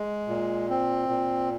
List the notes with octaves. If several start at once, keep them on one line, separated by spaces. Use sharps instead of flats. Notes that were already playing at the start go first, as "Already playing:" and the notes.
Already playing: G#3
A#2
C4
A#2